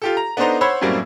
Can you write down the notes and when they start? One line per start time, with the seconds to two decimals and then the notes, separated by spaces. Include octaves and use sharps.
0.02 F4 G4 A4
0.17 A#5
0.37 B3 D4 D#4 A4 C5 A#5
0.61 C5 C#5 F#5 B5 E6 G#6
0.81 F#2 A2 F#3 G3 A#3 C4